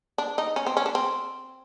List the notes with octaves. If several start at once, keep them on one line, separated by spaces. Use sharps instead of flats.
D4
D#4
C#4
C4
C#4
D4
C4